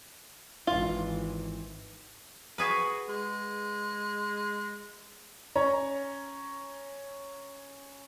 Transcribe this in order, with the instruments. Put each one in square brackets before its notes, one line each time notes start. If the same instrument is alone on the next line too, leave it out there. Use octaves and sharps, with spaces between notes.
[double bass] G#1 E3 [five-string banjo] F4
[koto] F#4 G#4 B4
[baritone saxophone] G#3
[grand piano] C#4 C#5 A#5